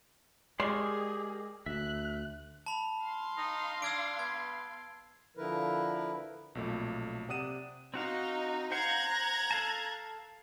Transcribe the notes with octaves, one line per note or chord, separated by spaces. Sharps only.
G#3 G4 G#4 A#4 D5 C6 C#6
D2 E5 F#6
A5 B5 F7
F5 C6
D#4
D4 E6 G#6 D7
B3 G#6
D3 F3 E4 A#4 B4
B1 F2 A#2 A3
C3 D5 F#5 D#6 D#7 E7
C4 D#4 F#4 F5
C5 F5 F#5 A#5 F#6 G#6
A4 F5 A5